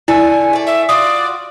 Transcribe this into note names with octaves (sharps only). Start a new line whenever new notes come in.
D3 E4 A4 G#5
A3 D5
E5
F4 F#4 D5 D#6